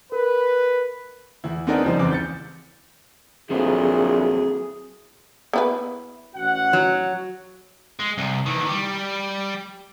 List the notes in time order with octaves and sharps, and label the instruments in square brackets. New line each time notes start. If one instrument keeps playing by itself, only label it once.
[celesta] A#4 [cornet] B4
[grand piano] E2 E4
B3 C4 D4 D#4 A#4 G#5
F#1 C#2 F3 G3 D#4 C5
F#1 E2 E3 C4 D6
G6 A6 C#7
[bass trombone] A#1 [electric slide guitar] F#3 C4 A4 [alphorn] E4 [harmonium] G#4
[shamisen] B3 E4 B4
[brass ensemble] A1 F#4 F#5
[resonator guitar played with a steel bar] F#3
[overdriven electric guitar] G#3
C2
D#3 E3
G3 G4